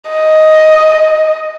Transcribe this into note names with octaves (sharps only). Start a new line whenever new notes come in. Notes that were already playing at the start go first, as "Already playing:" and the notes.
D#5